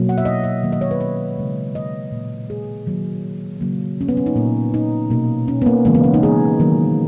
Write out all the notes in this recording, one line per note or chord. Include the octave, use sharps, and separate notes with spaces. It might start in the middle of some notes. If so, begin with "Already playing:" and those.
Already playing: B2 F#3 A#3
F#5
E5
D#5
E5
D#3 F#3 A#3
D#5
C#5
B4
C#5
C#3 G#3
D#5
A#2 A#3
G#4
D#3 F#3 A#3
C#3 F#3 A#3
C#4
B3
C#4
D#4
A#2 A#3
D#4
B2 A#3
C#4
B3
A#3
C#3 E3 G#3 A#3
B3
C#4
D#4
G#4
D#3 F#3 A#3